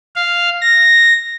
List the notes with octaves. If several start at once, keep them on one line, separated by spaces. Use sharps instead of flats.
F5
A#6